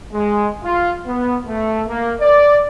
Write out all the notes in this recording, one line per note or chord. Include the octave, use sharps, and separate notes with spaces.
G#3
F4
B3
A3
A#3
D5